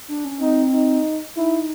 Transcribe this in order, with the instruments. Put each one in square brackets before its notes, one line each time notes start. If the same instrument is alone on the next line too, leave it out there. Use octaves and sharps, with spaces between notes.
[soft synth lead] D4
C#4
[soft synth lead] C4 [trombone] D#4
[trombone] D#4
[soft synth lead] D#4 [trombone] E4